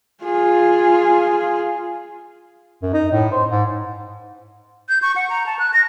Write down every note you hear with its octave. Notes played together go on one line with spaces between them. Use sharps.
F4 G#4
F#2
D#4
A2
C5
G#2
G6
C#6
F#5
A#5
A5
F#6
A#6